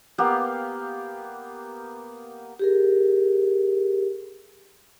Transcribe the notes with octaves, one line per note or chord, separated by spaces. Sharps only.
A#3 B3 G4 F5
G4 G#4 A#4